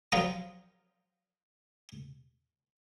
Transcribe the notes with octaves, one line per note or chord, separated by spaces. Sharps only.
F3 F#3 F4 G5 A#5 D#6